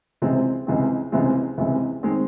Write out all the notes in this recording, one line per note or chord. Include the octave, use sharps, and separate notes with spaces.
C#2 C3 E3 G#3 C4
C#2 C3 E3 G#3 C4
C#2 C3 E3 G#3 C4
C#2 C3 E3 G#3 C4
D#3 G#3 C4